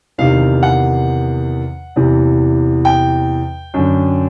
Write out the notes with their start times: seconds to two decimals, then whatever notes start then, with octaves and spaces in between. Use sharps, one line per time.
0.18 E2 C3 D#3 F5
0.63 F#5
1.96 E2 C3 E3
2.85 G5
3.74 F#2 D3